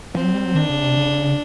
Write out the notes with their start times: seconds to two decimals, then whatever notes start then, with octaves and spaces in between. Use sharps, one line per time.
0.15 F3 C4
0.24 F#3
0.34 G3
0.45 F#3
0.55 D#3 D4
0.69 C#3
0.82 C3
0.97 C#3